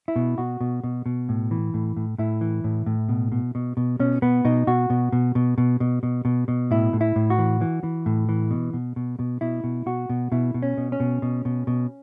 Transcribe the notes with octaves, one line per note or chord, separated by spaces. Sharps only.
E4
B2
B2 F#4
B2
B2
B2
A2
E3
A2
A2
A2 E4
E3
A2
A2
B2
B2
B2
B2
B2 C#4
B2 B3
B2 D#4
B2 F#4
B2
B2
B2
B2
B2
B2
B2
B2
A2 E4
A2
E4
A2
F#4
E3
E3
E3
A2
E3
B2
B2
B2
B2
B2 E4
B2
B2 F#4
B2
B2 E4
B2
C#4
B2
C#4
B2
B2
B2
B2